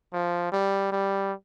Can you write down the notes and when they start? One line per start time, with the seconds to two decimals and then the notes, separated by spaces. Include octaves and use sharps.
0.13 F3
0.52 G3
0.92 G3